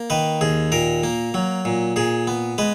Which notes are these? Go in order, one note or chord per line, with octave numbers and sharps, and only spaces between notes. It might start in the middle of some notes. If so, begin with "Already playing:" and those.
Already playing: A#3
D#3 B4
D#2 G#4
A#2 A#4
A#3
F#3
A#2
A#2 G#4
B3
G#3 B4